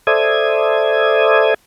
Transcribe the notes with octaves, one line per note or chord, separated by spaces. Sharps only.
A4 C5 D5 E5 D#6 G#6